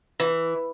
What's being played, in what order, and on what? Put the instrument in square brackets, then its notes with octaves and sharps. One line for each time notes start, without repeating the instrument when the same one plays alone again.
[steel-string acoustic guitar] E3